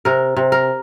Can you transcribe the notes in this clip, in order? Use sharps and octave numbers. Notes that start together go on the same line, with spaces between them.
C3 A#4
C3
A#4